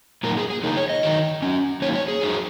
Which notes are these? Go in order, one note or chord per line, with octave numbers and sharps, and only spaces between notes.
A#2 F#3 A#3 D#4 A#4
G#4
G#4
C#3 A#3 D#4 A#4
C#5
D#5
D#3 F#3 D#4
F#3 C#4
F#3 A#3 D#4 C#5
C#5
G#4
F#3 D#4